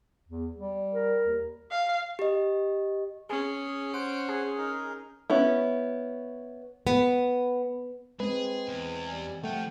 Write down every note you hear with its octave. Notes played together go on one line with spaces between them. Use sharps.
E2
G3
A#4
D#2
F5
G4 D#5
C#4 G#4
C5 F#5 D7
G#4
D#4 A#4
B3 C#4 E4
B3
G#3 C4 G#4 B4
E2 G#5
G3 G#5
F3 G3 A3 F4 F#5 G5